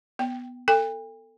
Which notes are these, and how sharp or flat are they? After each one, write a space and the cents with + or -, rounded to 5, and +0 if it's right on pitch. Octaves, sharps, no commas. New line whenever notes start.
B3 +0 G5 +0
A4 +25 G5 +40